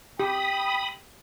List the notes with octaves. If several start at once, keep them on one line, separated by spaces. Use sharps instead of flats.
G4 G5 B5 D#6